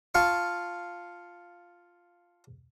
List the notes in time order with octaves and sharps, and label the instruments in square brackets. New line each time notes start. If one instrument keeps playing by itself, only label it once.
[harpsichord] F4 F5 A5 C#6